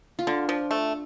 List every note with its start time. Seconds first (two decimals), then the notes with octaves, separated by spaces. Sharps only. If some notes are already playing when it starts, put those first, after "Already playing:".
0.19 F4
0.27 D3 D4
0.49 F3
0.71 A3